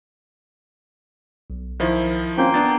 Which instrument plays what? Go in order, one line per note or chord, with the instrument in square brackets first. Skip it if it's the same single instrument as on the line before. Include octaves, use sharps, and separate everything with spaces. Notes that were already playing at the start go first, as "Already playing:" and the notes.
[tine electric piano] B1
[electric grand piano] D#3 F3 E4
[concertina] A#3 G5 [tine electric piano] C4 C#4 F4
[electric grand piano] B3 D4 [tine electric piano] A6